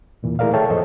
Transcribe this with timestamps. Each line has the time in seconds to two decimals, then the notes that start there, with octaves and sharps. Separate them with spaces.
0.23 D#2 A#2 E3
0.39 A3 E4 G#4 A#4 D5 F5
0.53 G#4 A4 C#5 E5 G5 A5
0.70 F2 A#2 F3 A4 C5 D#5